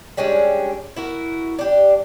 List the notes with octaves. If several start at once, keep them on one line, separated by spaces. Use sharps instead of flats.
G3 G#3 C#4 D4
E4 F#4 A#4
D4 G4